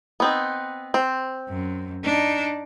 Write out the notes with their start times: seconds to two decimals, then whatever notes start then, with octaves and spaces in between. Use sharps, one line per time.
0.20 B3 C4 D#4
0.94 C4
1.49 F#2
2.04 D4 D#4